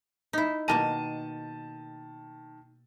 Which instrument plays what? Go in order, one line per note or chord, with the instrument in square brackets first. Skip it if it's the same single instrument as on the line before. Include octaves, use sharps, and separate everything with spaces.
[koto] D#4 E4
[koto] B2 A#3 A#5 [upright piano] D#3 A5 D#7